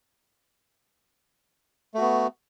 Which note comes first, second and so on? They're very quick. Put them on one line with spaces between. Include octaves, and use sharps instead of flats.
A3 F#4 B3